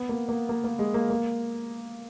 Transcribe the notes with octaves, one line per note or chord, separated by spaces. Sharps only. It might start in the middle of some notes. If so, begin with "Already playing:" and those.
Already playing: B3
A#3
A#3
A#3
A#3
G#3
A#3
A#3